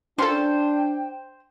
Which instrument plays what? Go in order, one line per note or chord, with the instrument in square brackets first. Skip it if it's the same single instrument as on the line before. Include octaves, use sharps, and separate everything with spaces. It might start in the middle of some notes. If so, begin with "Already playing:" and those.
[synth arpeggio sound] C#4 F4 A4 [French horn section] D4 [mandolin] C5 [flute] G5